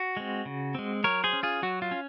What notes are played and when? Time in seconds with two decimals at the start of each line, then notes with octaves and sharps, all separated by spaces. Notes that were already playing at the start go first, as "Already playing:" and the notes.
Already playing: F#4
0.17 G#3 C4
0.45 C#3
0.75 G#3 C4
1.04 F#3 A#4 C#5
1.24 G#4 C5
1.33 C#4
1.43 F4 G#4
1.62 F#3 F#4
1.82 F4
1.91 C#4